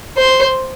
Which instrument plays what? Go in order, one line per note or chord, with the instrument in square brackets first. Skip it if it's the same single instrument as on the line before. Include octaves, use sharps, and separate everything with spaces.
[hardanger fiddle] C5